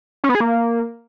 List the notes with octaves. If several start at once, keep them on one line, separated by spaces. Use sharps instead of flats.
C#4
B3
G#4
A#3